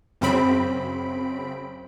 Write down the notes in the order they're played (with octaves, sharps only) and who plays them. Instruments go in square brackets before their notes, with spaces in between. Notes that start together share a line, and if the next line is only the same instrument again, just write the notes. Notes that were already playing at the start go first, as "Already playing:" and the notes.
[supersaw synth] F#2 C#3 C4 B5 D7